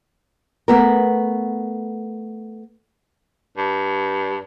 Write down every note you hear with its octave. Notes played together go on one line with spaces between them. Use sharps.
A3 B3 A#4
G2